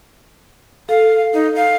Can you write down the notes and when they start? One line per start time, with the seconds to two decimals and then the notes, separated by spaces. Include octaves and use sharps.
0.89 A4 F5
1.33 D#4
1.55 F5